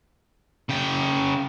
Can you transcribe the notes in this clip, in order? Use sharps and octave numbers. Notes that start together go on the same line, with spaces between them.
C#3 G5